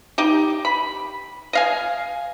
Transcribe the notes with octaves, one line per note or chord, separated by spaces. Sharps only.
D#4 G4
B5
D#5 F5 G#5